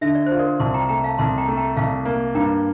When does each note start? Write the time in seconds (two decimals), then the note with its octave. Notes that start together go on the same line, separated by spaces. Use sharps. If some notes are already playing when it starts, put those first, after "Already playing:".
0.01 D3 E5
0.15 D5
0.26 C5
0.32 F4
0.39 A#4 D5
0.60 C2 A5 C6
0.74 G5 A#5
0.89 A3 G5 A#5
1.04 F5 A5
1.18 C2 A5 C6
1.38 G5 A#5
1.48 A3
1.57 G5 A#5
1.77 C2 F5 A5
2.05 A#3
2.35 G2 G5 A#5